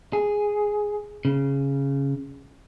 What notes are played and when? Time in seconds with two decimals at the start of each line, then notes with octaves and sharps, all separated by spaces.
0.13 G#4
1.25 C#3